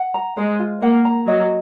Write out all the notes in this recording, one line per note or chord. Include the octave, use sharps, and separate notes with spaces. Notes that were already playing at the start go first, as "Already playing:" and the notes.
Already playing: F#5
A#5
G#3 C5
F4
A#3 F#5
A#5
F#3 D#5